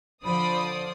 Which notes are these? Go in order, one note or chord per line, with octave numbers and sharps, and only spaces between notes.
D3 F3 C5 D5 B5 D#6